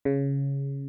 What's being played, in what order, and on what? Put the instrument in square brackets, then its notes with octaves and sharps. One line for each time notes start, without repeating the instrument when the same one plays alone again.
[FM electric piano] C#3